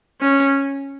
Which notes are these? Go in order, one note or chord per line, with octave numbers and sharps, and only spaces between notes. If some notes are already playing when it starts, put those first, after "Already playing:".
C#4